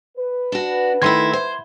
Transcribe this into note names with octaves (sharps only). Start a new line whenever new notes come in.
B4
D4 F#4
D#3 A3 E4 C6 G#6
C5